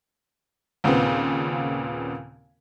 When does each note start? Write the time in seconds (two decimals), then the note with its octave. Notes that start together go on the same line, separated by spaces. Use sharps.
0.84 D#2 A#2 C#3 B3 C4